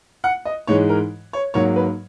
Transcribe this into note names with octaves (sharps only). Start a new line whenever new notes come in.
F#5
D#5
G#2 E3 G#3 C#5
A#4
C#5
G#2 F#3 A#3 C#5
B4